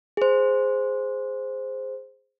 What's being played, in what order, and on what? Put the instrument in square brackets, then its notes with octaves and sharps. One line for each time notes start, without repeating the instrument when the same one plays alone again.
[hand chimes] G#4 C5